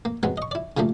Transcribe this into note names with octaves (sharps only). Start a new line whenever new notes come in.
A#3
F#3 G#3 B3 C4
D#5 C#6
E4 D5
C#3 F3 G3 A3 A#3